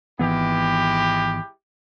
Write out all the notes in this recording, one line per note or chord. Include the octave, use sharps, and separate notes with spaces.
G#1 E3 G#3 B3 E4 G4